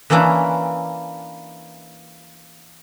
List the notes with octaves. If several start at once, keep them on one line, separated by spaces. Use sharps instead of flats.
E3 A#3 C#4 D4 E4